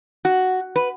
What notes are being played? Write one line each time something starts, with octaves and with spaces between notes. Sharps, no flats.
F#4
B4